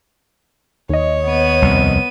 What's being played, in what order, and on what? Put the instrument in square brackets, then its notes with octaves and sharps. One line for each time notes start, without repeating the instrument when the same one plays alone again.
[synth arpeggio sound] D#2 D#5 [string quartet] C#5
[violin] B3 D#7
[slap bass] C2 F2